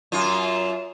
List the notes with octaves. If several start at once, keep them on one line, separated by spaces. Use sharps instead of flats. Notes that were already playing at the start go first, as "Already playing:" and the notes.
F#2 F4